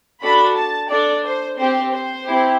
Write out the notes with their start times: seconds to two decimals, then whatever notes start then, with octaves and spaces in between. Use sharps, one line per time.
0.22 D4 F#4 A4 B5
0.56 A5
0.90 D4 A4 D5
1.24 C5
1.58 C4 G4 C5
1.92 C5
2.26 C4 E4 G4